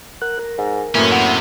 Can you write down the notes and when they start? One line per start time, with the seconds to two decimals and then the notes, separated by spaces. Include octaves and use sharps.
0.22 A#4 F#5 F#6
0.39 A#4
0.58 G#2
0.95 F#2 A2 E3 A#3 C#4
1.12 C3 B3